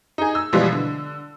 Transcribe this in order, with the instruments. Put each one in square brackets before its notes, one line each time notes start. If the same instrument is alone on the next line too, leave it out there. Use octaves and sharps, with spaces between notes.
[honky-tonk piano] D#4 G#4
E6
B2 E3 F3 G3 G#3 B3
D3